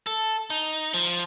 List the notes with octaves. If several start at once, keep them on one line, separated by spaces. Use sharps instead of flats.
A4
D#4
F3